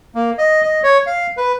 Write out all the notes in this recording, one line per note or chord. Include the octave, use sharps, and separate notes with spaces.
A#3
D#5
D#5
C#5
F5
B4